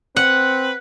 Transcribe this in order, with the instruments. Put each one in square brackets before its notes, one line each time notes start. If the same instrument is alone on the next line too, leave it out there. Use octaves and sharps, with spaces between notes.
[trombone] C4 [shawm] B4 [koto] F#5